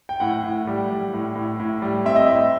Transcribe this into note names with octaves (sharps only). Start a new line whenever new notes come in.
G5
A2 F#5
A2
G3
G3
A2
A2
A2
G3
C4 E5
D#5
A2 E5